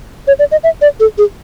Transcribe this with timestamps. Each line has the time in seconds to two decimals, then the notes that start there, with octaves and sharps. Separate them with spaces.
0.27 C#5
0.39 D5
0.51 D#5
0.64 E5
0.82 D5
1.00 A4
1.18 G#4